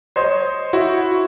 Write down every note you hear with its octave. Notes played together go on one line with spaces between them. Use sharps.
C5 C#5 D#5
E4 F#4